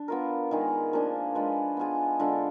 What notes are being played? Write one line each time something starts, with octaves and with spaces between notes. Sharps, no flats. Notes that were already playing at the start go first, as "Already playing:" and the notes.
Already playing: D4
B3 F4 A#4
D#3 G#3 D#4 G#4
F3 A#3 D4 G#4
G#3 D4 F4 B4
B3 F4 G#4
D3 G#3 D4 F4